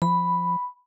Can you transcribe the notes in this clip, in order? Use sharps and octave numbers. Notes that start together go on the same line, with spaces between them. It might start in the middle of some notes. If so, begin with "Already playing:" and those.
F3 B5